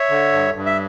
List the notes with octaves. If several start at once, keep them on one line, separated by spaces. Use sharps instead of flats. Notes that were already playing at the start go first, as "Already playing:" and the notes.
Already playing: C#5 E5
D3
G2
G2
E5